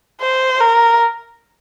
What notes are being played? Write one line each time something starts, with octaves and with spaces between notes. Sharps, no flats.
C5
A#4